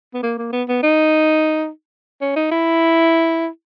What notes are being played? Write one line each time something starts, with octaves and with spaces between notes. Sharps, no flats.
B3
A#3
A#3
B3
B3
D#4
C#4
D#4
E4